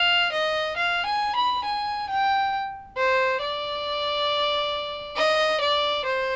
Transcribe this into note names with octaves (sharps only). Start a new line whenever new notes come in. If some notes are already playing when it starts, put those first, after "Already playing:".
Already playing: F5
D#5
F5
G#5
B5
G#5
G5
C5
D5
D#5
D5
C5